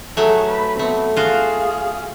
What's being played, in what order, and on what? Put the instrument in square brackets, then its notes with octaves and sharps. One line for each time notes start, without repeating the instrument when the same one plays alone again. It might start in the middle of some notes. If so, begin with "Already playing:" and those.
[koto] F#3 A3 [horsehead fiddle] G#4
[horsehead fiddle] B4
[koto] A3 [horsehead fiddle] B3 C4
[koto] F4 F#4 [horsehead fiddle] G#4 F5